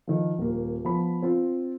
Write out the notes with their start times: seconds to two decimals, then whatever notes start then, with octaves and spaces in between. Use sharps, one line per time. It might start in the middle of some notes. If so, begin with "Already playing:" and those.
0.07 D#3 F3
0.38 D#1 A#3
0.84 F3 B3 B5
1.23 C4 F4